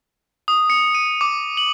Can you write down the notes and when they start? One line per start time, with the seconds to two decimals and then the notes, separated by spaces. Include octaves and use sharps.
0.48 D#6
0.70 C#7
0.95 D#7
1.21 D6
1.57 F#7